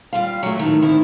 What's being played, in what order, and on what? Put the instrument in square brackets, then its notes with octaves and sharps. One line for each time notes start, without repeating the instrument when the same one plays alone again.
[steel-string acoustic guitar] G3 F4 F5
F#3 A3
A2 D#3
D2 D#3 C4 E4